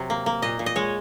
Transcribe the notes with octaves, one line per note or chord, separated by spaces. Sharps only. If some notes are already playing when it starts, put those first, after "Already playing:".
Already playing: C3 F#3
A#3
A#3
A#2 D#5
A#2
D#5
G#3 C#5